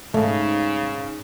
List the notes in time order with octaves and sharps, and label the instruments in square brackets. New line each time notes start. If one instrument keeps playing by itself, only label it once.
[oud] G#2 [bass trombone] C#3 [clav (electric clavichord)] A3